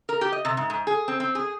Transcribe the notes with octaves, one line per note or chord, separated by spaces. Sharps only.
A#4
G4
D#5
C3
G#2
G#2
G#4
C4
C4
G#4